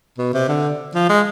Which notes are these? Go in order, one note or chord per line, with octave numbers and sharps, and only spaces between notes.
B2
C3
D3
F3
G#3